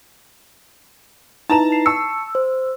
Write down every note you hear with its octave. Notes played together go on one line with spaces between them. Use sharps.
D#4 E4 B4 A5 A#5 E7
C7
A5 C#6 E6 C#7
C5